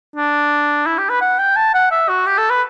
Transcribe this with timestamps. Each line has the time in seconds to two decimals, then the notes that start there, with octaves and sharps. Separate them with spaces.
0.16 D4
0.86 E4
0.98 G4
1.09 B4
1.21 F#5
1.39 G5
1.56 A5
1.74 F#5
1.91 E5
2.09 F#4
2.26 G4
2.38 A4
2.50 B4